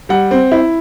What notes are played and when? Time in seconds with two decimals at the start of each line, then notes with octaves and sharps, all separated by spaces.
0.09 G3 F#5
0.31 C4
0.52 E4